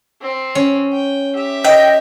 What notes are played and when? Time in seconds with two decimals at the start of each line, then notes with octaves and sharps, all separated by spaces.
0.21 C4
0.55 C#4
0.92 G5
1.35 G4 E5
1.65 D#5 G5